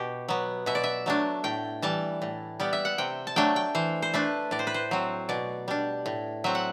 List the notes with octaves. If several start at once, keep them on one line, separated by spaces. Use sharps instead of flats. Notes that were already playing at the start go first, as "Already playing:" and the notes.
Already playing: B2 G4
F#3 B3
B2 E5
D5
E5
F#3 A3 D4
A2 G5
E3 G3 A5
A2
G3 B3 D5
E5
F#5
C3 G5
A5
F#3 A3 D4 G5
G5
E3 C5
C5
A3 D4 B4
A2 D5
C5
B4
C5
F#3 C4
B2 D5
G3 D4
A2
F#3 C4 E5
F#5